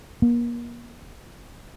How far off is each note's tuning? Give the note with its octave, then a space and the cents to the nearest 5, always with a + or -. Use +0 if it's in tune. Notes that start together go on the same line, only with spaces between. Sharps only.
A#3 +35